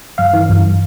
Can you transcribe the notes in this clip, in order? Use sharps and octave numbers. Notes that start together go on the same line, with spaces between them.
G2 F5
E3
G2